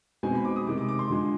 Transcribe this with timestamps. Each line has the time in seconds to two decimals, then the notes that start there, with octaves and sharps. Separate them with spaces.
0.23 B2 G#3 C4 D#4 G#5
0.35 B5
0.45 D6
0.56 D#6
0.67 C3 D#3 G#3 D6
0.78 D6
0.88 D6
0.99 C6
1.10 D3 F3 G#3